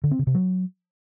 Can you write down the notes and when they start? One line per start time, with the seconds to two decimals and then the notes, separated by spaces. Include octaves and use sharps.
0.04 D3
0.11 C4
0.19 C#3
0.27 C3
0.35 F#3